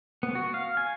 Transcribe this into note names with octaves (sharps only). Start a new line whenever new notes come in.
B3
F#4
F5
G#5